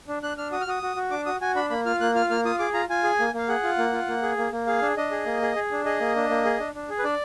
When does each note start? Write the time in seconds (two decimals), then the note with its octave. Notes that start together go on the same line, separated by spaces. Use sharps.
0.08 D4
0.22 D4 F#6
0.37 D4 F6
0.52 F#4 D#6
0.61 F6
0.67 F#4 D#6
0.82 F#4
0.96 F#4
1.11 D4 D6
1.26 F#4 D#6
1.41 F#4 G#5
1.55 D4 B5
1.70 A#3 B5
1.86 F4 F6
2.00 A#3 F#6
2.15 F4 F6
2.30 A#3 F6
2.45 F4 D#6
2.59 G#4 D6
2.74 F4 A#5
2.89 F4 G#5
3.03 G#4
3.19 A#3
3.34 A#3 F5
3.49 G#4 F#5
3.64 F4
3.78 A#3
3.93 F4
4.08 A#3
4.23 G#4
4.37 A#3
4.52 A#3
4.67 G#4 F5
4.82 D4
4.97 D4 D#5
5.11 G#4
5.26 A#3
5.42 G#4
5.55 G#4
5.71 D4
5.85 G#4 D#5
6.00 A#3
6.16 D4
6.30 A#3
6.45 G#4
6.59 D4
6.75 D4
6.89 G#4
6.99 B4
7.04 D4 D5